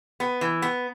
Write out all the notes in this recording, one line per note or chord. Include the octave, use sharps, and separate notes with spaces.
B3
E3
B3